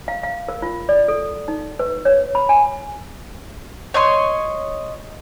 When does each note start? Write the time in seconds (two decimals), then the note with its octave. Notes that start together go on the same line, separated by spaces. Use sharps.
0.08 F5
0.23 F5
0.48 A#4
0.62 F4
0.89 D5
1.08 A4
1.48 D#4
1.79 B4
2.05 C#5
2.35 B5
2.49 G#5
3.94 C#5 D#5 C6